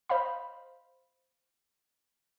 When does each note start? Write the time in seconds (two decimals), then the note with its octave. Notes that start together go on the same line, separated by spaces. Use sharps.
0.09 C5 D#5 F5 B5